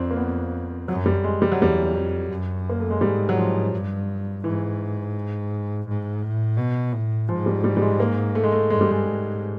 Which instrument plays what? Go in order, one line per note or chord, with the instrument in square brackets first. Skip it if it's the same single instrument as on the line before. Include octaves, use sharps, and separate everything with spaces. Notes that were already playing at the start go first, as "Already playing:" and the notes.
Already playing: [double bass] F2 [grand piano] C4 D4
[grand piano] A#3
B3
[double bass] F#2 [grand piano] F#3
[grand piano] G3
G#3
G3
F#3
[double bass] E2 [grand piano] G3
[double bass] F2
F#2
[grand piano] A#3
A3
G#3
[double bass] G#2 [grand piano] G3
[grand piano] F#3
F3
[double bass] G2
[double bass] G#2 [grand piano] E3
[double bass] G#2
A2
B2
A2
[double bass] G#2 [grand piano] F3
[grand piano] G3
G3
G3
G#3
A#3
A3
G#3
A3
[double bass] G2 [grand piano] G#3
[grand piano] G3
G#3
[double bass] G#2